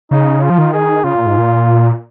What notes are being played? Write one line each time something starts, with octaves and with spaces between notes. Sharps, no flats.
C#3 D#4
F4
F3
D#3
G#4
C#3 F4
A#2
G#2
A#2